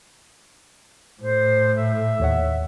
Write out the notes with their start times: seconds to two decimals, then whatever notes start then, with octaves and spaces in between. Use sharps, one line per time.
1.22 A2 C5
1.75 E5
2.20 D#2 C#5 F#5